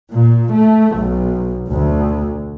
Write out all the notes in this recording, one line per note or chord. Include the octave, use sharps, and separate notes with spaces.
A#2
A3
B1
D2